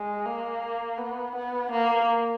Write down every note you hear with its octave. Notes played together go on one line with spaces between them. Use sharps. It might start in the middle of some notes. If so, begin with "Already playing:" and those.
Already playing: G#3
A#3
B3
B3
A#3